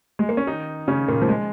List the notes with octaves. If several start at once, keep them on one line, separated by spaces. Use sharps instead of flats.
G#3
A#3
C#4
D#3 D#4
C#3 C#4
A#2 A#3
F3
G#3